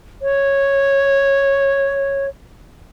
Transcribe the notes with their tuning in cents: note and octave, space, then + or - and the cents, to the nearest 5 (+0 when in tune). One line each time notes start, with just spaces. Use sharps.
C#5 -10